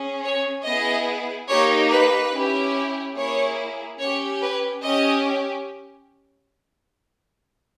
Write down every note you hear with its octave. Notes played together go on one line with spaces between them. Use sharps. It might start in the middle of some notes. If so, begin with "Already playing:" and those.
Already playing: C#4 G#4
C#5
B3 E4 G#4 D#5
A#3 D#4 G4 C#5
B4
C#4 E4 G4
A#3 E4 G#4 C#5
C#4 G4 C#5
B4
C#4 G4 D#5